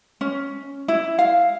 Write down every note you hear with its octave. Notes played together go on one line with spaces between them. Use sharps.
C#4
E4
F5